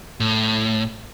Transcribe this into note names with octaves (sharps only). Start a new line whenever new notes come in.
A2